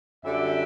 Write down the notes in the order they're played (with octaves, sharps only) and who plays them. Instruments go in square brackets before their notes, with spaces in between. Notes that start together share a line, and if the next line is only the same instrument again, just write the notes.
[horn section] F#2 D3 G3 E5